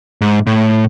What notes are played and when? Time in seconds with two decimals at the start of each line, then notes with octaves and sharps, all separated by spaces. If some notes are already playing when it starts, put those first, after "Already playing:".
0.21 G#2
0.47 A2